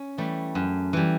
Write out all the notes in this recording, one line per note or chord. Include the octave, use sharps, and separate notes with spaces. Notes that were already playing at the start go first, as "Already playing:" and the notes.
Already playing: C#4
E3 G3 A3
F#2
E3 G3